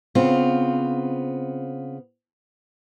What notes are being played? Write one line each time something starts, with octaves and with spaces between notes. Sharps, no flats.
C#3 B3 C4 F4